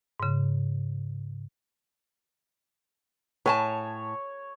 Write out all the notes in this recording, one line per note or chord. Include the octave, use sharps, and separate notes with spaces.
G#2 C#3
A2 C#5 G#5 A5